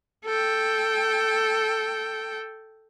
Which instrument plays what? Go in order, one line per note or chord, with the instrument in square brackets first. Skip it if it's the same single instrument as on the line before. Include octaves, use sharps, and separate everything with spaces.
[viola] A4 G5